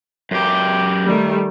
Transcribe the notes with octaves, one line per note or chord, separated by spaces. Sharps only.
F#2 G4
D#3 G3 A3